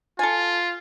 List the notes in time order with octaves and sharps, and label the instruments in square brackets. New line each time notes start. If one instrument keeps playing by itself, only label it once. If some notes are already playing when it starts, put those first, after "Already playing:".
[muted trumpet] F4 [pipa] A4 G#5